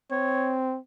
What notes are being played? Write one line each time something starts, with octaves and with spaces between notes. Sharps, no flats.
C4 C#5